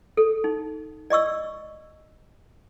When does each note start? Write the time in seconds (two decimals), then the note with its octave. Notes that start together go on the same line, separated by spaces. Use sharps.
0.17 A4
0.44 D#4
1.10 D5 D#5 C#6 E6